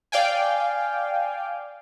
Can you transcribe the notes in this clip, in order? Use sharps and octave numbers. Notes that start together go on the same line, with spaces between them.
D5 F5 G5 G#5